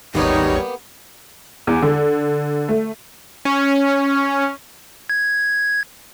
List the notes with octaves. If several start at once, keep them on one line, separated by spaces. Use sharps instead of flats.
G#1 D#2 G3 A#3 B3 D#4 G4 C#5
E2
D3
A3
C#4
G#6